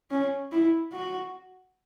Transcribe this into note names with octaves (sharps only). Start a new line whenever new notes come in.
C#4
E4
F#4